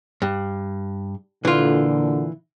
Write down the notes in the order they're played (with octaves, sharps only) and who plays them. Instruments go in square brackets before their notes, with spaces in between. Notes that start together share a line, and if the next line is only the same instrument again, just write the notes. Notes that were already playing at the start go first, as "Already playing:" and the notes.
[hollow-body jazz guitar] G2
[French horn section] A#2 D3 [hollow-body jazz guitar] E3 F4